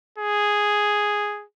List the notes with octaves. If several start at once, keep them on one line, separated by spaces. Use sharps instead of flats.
G#4